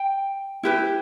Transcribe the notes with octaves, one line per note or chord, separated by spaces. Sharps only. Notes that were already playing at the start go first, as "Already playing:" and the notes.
Already playing: G5
E4 G4 B4